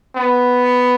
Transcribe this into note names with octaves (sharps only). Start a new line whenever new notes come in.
B3